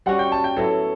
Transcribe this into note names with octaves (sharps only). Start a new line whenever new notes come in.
G3 C#4 F#4 F#5
G5
A5
G5
A2 F#3 B3 E4 A4